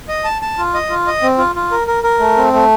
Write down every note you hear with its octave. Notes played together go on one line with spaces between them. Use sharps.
D#5
A5
A5
F4
D#5
F4
D#5
C4
F4
F4
A#4
A#4
A#4
A3
C4
A3